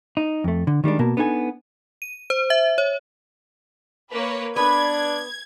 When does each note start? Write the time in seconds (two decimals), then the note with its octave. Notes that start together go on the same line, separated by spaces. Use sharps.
0.17 D#4
0.44 F2 A3
0.67 D3
0.84 D#3 G3 G#3 D4
0.99 B2 A#3 A#4 A5
1.17 B3 D4 D#4 A4 G#5
2.02 D#7
2.30 C5
2.50 E5
2.78 C#5
4.12 A#3 B4 C#5
4.56 B3 D4 B4 G#6